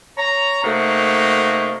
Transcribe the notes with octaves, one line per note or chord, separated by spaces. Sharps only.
C#5 A#5
C3 A3 A#3 D#4 F#4